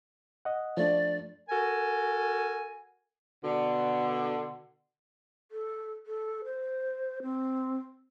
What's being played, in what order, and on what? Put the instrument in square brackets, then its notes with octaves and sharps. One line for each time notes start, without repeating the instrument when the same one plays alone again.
[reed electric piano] D#5 F#5
[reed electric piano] F3 A3 D4 [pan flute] D5
[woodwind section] F#4 A4 A#4 G#5
[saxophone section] B2 D3
[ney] A4
A4
C5
C4